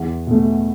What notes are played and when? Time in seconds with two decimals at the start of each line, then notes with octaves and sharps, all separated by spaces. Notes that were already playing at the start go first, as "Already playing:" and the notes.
Already playing: E2
0.27 B2 A3